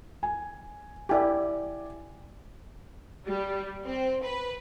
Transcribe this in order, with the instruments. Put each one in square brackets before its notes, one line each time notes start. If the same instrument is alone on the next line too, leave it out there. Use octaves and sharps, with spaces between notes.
[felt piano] G#5
[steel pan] E4 G4 [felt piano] D5 G#5
[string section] G3
C4
B4